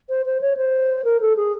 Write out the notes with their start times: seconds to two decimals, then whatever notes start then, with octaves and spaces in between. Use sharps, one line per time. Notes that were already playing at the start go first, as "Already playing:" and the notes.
0.09 C5
0.26 C5
0.41 C#5
0.57 C5
1.04 A#4
1.21 A4
1.36 G#4